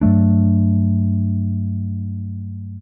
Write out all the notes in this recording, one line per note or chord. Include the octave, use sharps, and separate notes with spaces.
G2 F#3 A3 D4